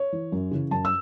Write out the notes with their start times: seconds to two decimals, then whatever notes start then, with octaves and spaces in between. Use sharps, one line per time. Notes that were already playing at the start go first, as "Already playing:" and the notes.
Already playing: C#5
0.12 E3
0.32 F#2
0.51 C#3 E3
0.71 F#2 A5
0.85 E6